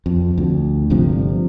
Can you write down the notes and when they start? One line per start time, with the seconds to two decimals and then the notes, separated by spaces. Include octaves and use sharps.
0.06 F2
0.38 D2
0.90 G1 G2 C3 F3